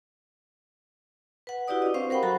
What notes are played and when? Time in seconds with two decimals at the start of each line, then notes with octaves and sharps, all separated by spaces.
1.47 B4 F#5
1.68 E4 F#4 G4 B4 D5 D#6
1.82 D4 D#5
1.94 C4 C5 F5 C#6
2.10 A#4 C5 F#5 G5 B5
2.23 F#3 F#4 A4 C5 A#5